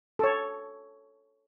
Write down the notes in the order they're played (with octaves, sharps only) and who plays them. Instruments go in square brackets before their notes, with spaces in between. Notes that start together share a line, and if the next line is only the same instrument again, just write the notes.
[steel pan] A4 C#5